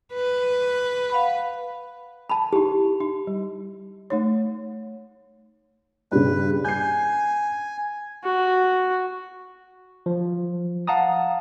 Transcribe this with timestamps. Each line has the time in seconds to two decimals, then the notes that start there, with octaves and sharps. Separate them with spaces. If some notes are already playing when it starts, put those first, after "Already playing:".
0.14 B4
1.10 F5 F#5 B5
2.29 A5 B5
2.53 D#4 E4 G4
3.00 D#4
3.27 G3
4.10 A3 D#4 C#5
6.12 G2 C#3 B4
6.65 G#5 G6 C7
8.24 F#4
10.06 F3
10.87 F5 F#5 A5 A#5 D#6